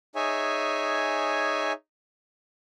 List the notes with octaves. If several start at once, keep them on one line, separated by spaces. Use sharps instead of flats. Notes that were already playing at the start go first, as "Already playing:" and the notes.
D#4 G#4 C#5 E5 G#5